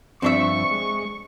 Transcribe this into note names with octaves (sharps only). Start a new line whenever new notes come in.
G2 F3 C4 D4 E5 C#6
G#3